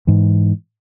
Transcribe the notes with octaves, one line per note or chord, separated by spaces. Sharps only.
G#2 E3